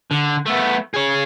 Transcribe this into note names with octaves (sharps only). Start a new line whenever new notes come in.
D3
A3 B3
G#4 C#5